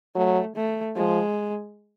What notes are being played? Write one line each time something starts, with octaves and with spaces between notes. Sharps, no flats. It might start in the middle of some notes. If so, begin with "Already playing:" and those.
F#3 A3
A3
F3 G#3